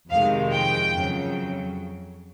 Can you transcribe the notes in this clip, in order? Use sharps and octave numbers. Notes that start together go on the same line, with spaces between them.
F2 C3 D#3 G#3 F5
G5
F2 C#3 F#3